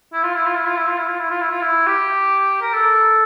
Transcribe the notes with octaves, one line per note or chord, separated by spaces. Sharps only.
E4
F4
E4
F4
E4
F4
E4
F4
E4
F4
E4
F4
E4
F4
E4
G4
A#4
A4